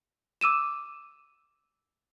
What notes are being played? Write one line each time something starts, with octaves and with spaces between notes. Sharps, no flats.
D6 E6 D#7 E7